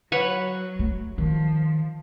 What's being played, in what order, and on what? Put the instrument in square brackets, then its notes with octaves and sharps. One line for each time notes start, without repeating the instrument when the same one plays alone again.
[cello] F#3 [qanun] B4 C#5 F#5
[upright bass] A3
[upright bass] D#3 [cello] F3